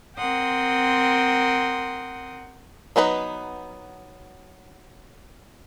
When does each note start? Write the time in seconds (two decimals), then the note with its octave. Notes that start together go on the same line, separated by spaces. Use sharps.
0.17 C4 A#4 F#5 G5 C6 D#6
2.96 F#3 B3 D#4 B4